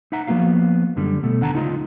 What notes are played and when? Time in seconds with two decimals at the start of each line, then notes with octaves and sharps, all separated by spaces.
0.12 D#4 E5 F#5 A#5
0.27 F3 A#3 B3 F#4 F5
0.96 F#2 D3 G3
1.23 B2 A3
1.40 D#2 D3 F#5 A5 A#5
1.54 C#2 D#4 F4 D#5